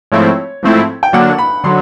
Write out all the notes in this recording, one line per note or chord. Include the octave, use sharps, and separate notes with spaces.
G#2 F3 A3 C4 E4 C#5
G#2 F3 A3 C4 E4
G5
D3 F#3 A#3 D4 F#5
B5
D3 F#3 C6